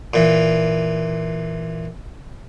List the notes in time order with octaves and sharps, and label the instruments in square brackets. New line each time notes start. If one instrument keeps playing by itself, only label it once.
[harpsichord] A#2 E3